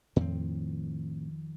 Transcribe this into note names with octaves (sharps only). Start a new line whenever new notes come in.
F2 A2 D#3 C4